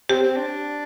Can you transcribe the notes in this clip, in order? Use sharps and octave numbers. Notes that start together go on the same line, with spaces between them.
C4 G4
C4
D4